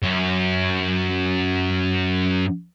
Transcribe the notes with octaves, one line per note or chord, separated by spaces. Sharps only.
F#2 C#4